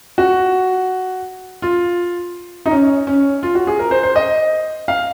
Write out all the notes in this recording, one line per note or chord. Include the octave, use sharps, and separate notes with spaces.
F#4
F4
D#4
C#4
C#4
F4
F#4
G#4
A#4
C5
C5
D#5
F5